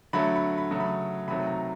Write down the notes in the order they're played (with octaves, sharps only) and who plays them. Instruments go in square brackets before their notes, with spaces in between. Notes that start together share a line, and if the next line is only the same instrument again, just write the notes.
[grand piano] D3 F#3 A3 B5
B5
B5
C#3 F#3 A3
B5
C3 D#3 F#3 A3 B5
A#5